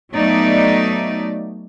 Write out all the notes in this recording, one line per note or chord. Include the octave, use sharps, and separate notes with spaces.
F#3 A3 B3 D#4 D5